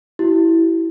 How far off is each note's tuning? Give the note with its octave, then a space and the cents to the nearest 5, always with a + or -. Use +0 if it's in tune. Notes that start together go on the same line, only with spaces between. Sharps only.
E4 +0 G4 -45